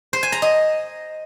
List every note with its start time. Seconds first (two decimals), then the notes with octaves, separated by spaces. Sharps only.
0.13 C5
0.23 G#5
0.32 A#5
0.42 D#5